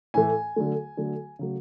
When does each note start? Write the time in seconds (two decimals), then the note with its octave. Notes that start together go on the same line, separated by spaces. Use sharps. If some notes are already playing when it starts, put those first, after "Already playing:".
0.14 A2 E3 A3 G#5
0.56 D3 F#3 A3
0.97 D3 F#3 A3
1.39 C#3 F#3 A3